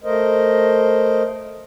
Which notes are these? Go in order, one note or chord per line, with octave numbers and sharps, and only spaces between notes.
A3 A#4 C5 D#5